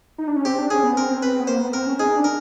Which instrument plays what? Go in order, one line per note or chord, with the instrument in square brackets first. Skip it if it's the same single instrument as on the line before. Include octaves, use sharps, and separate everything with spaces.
[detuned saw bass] D#4
D4
C#4
[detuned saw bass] C4 [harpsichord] G4
[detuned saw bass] D4
[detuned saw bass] C#4 [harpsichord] G#4
[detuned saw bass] B3
[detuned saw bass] C4 [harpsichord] A#4
[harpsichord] B4
[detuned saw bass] B3
[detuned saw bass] A#3 [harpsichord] C5
[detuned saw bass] B3
[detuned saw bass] C4 [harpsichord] A#4
[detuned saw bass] C#4
[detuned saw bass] D#4 [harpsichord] G#4
[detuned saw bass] D4
[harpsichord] A#4